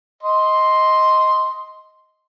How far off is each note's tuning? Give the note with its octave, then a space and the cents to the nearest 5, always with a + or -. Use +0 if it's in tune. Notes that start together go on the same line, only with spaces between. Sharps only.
D#5 +10 C6 +0